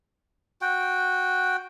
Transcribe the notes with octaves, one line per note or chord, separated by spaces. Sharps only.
F#4 G5